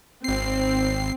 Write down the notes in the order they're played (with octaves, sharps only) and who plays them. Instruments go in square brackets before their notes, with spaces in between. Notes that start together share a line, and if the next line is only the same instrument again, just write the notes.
[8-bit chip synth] G#1 C7 [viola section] C4